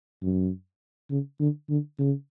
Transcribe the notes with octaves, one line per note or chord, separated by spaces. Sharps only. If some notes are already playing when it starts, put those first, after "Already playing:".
F#2
C#3
D3
D3
C#3